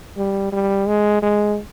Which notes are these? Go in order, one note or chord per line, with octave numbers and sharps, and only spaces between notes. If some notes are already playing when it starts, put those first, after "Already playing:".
G3
G3
G#3
G#3